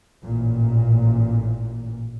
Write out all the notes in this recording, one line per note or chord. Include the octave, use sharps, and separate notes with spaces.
A1 A#2